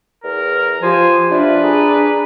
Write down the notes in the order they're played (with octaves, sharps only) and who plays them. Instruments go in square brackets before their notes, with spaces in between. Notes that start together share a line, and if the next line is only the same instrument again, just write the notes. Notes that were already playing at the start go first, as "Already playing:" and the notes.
[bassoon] E2 [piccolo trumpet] A#4
[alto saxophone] F3 [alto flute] G4 [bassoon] C5 [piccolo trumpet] G#5
[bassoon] C3 [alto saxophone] D4 [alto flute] F4 [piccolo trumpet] B4
[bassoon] G#4 [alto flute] A#5